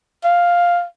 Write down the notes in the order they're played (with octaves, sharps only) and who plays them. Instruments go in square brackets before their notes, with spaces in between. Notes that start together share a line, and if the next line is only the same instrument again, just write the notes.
[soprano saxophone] F5